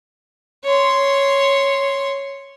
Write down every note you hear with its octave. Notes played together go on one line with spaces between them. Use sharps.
C#5 C6